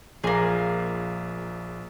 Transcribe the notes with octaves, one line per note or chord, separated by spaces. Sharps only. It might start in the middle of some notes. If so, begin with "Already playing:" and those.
A#1 A#3 G#4